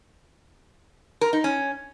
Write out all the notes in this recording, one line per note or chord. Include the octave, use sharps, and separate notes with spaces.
A#4
D#4
C#4